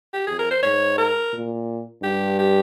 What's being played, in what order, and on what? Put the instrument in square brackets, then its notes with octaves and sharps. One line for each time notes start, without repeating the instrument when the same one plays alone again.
[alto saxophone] G4
[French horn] F2 [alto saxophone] G#4
[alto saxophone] A#4
C5
[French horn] G#2 [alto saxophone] C#5
[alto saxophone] A#4
[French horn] A#2
[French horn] G2 [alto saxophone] G4
[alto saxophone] G4